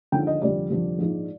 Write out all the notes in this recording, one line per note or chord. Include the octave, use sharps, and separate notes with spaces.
D#2 D3 F3 G#3 G5
D#5
F1 F2 D3 G3 D5
F1 F2 D3 G3
A#1 G#2 F3 G#3